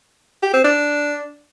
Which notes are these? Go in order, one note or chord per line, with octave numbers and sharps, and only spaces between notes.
G4
C4
D4